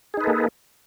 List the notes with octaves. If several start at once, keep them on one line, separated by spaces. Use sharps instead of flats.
A#3 D#4 G#4 A4 B4